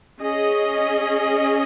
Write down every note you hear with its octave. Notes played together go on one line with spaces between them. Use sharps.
C#4 G#4 D#5